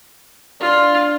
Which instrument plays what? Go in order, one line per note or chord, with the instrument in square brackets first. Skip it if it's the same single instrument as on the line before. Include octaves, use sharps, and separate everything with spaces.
[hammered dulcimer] D4 [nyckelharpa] F4